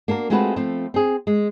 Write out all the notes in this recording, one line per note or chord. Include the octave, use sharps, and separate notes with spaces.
A#3 D4 F#4 A#4
G#3 A3 C4 F4 F#4 B4
F3 A3 C4
C4 G#4
G#3